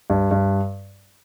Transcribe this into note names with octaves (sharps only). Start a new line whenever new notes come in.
G2
G2